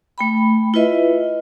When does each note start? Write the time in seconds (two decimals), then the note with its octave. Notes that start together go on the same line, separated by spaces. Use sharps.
0.18 A3 G5 B5
0.74 E4 F4 B4 D#5 E5